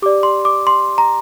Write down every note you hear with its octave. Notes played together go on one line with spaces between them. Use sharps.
G4 D5 D6
C6
D6
C6
A#5